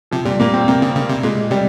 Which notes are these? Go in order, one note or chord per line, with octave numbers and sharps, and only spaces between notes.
C3 F3
A#2 G3
A#2 A#3
C4
C3 A#3
C#3
C#3
C3
A#2 G#3
C3 G3